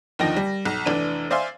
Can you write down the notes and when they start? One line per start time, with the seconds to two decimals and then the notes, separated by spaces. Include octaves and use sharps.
0.19 D#2 D3 F3 D#4 G5 A#6
0.36 G3
0.65 B1
0.85 F1 E3 D4 D#7
1.30 C5 D5 E5 F5 G#5 C6